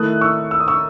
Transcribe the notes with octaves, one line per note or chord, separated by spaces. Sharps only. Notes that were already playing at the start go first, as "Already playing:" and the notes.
Already playing: D#3 A3 E4 D#6 F#6
C#6 E6
E6
D#6
C#6 E6